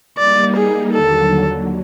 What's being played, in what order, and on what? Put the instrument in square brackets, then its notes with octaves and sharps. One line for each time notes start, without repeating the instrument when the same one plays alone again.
[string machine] G3 A#3 D#4 [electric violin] D5
[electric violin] G#4
[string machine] D#2 D3 F#3 [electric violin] A4